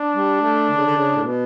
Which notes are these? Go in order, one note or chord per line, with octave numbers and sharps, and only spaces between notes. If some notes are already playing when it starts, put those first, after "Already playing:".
Already playing: D4
G3
A3
D3
C#3
D3
C#3
A2
B2